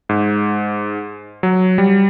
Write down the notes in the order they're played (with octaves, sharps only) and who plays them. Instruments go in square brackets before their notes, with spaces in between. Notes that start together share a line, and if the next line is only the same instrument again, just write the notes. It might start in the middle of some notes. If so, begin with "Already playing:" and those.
[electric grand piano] G#2
F#3
G3